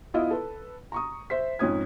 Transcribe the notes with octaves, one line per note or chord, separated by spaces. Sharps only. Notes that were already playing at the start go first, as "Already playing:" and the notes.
B3 E4 F4 D#5
A4 B4
A#5 C#6 D#6
C5 E5 B6
F2 G#2 C#4 D#6 G#6